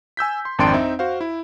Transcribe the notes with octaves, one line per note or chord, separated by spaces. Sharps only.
G#5 E6 G6 B6
C6
G#1 F2 D4 G5 C6 D7
C4 D#4 E5
F#4 C5 F5
E4